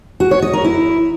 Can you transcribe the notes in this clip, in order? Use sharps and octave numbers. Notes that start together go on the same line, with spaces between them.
F#4
C#5
D#5
A#4
E4